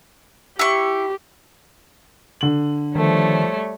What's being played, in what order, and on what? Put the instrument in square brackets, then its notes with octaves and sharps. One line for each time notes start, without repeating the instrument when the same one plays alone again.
[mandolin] E4 C#6 [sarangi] G4
[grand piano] D3 F#7
[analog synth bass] D#3 [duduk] F3 [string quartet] G3 A3 C#5